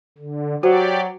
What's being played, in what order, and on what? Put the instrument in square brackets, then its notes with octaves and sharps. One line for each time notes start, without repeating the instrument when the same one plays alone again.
[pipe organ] D3
[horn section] F#3 [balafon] F#4 C5 [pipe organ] G4 D5